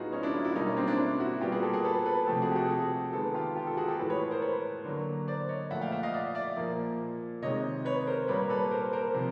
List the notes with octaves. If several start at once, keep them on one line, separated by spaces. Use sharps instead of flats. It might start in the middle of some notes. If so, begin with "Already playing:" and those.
Already playing: A2 F#3 B3 D#4 F4 F#4 G#4
C#4 D#4
D4 E4
D#4 F4
E4 F#4
B2 G3 A#3 D#4 F4
C#4
C4 D4
D4 E4
D4 E4
E4 F#4
A#2 G3 B3 F4 G4
F#4 G#4
G4 A4
G#4 A#4
A4 B4
A4 B4
C3 F3 A3 G4 A4
F#4 G#4
G4
F#4 G#4
A4
F#4 G#4
D#3 G#3 B3 G4 A4
F4 G4
F4 G4
G4 A4
F#4 G#4
G4 A4
A2 E3 G#3 A4 B4
B4 C#5
A#4 C5
B4 C#5
D3 F#3 A#3
C5 D5
C#5 D#5
A#2 F3 A3 E5 F#5
F5 G5
E5 F#5
D#5 F5
D5 E5
D5 E5
A#2 F3 A#3
C3 D#3 G#3 C#5 D#5
B4 C#5
A#4 C5
A#2 G3 A#3 B4 C#5
A4 B4
A#4 C5
A#4 C5
C3 F3